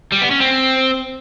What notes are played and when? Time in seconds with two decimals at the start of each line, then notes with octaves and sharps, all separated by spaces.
0.12 G3
0.21 B3
0.31 C#4
0.40 C4